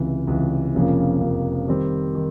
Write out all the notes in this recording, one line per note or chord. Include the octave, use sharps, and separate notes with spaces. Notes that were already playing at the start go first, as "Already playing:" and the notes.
Already playing: C#2 C3 E3
C#2 C3 E3
F1 F2 C#3 F3 A#3
F1 F2 C#3 F3 A#3
D#3 G3 C4
D#3